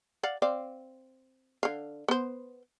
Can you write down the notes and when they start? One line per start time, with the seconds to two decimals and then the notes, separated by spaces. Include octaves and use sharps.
0.23 D5 F5 F#5
0.42 C4 D5 F5
1.63 D3 F5
2.08 B3 C5